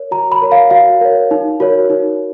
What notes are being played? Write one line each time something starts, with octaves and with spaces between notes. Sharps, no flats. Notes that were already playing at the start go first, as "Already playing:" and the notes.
Already playing: A#4 C#5
F#4 A#5
B5
A#4 C#5
F5
F#4 F5
A#4 C#5
D#4
F#4 A#4 C#5
D#4